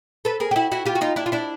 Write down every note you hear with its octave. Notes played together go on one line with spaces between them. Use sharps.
A4 B4
G#4 A#4
G4
E4 F#4
E4 F#4
F4 G4
F#4
D#4 F4
D4 E4
F4
D4 E4